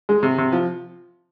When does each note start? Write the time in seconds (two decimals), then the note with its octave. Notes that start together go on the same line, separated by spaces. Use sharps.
0.09 G#3
0.23 C3
0.38 C3
0.52 F3